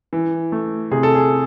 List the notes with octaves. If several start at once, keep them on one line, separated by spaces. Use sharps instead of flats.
E3
A3
C3 G#4
A4
G#4